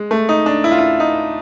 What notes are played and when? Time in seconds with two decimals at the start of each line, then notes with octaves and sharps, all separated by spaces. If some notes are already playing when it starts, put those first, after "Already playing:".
Already playing: G#3
0.11 A3
0.29 D#4
0.46 D4
0.64 E4
0.71 F4
0.79 E4
1.00 D#4